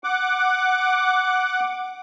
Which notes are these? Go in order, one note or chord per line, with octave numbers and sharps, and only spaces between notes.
F#5 D6